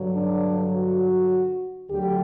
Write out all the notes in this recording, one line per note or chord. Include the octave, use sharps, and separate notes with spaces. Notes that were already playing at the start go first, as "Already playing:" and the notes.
Already playing: G2 D3 F#3
D4
F#4
D2 D3 F#3 G4